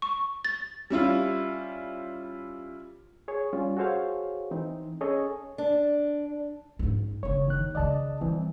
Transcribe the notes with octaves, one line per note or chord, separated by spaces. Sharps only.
C#6
A6
G3 C#4 E4 F4
G#4 C#5
G3 C#4 F4
F#4 G#4 A4 C5 C#5 F5
E3 C4 D#4
C#4 G#4 A4 C#5 D#5
D4
G#2 C#4
G1 C#3 C#5
D#2 D#3 F#6
C#3 D4 D5 D#5 A5
E3 G3 C4